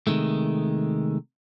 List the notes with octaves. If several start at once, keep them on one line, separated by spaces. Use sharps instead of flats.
C3 D#3 G#3 A3